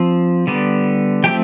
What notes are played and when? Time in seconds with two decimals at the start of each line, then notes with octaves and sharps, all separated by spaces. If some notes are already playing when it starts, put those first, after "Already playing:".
Already playing: F3 C4
0.47 D3 G3 B3
1.24 F3 A3 C4 G4 G5